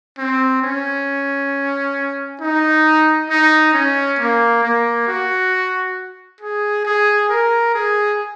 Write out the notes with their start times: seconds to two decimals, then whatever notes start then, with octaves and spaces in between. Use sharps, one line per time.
0.18 C4
0.62 C#4
2.41 D#4
3.29 D#4
3.74 C#4
4.19 A#3
4.63 A#3
5.07 F#4
6.41 G#4
6.85 G#4
7.30 A#4
7.74 G#4